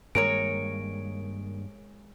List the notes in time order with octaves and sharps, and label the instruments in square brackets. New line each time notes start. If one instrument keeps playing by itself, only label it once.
[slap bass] G2 D#3 A#3 [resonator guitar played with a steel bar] G#3 A#4 C#5 [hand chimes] D7